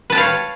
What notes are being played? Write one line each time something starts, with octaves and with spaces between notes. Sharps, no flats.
B4 C#5 F5 G5 A5